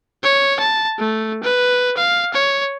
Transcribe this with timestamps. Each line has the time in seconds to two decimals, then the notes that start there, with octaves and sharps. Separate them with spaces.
0.23 C#5
0.60 A5
0.99 A3
1.43 B4
1.97 F5
2.34 C#5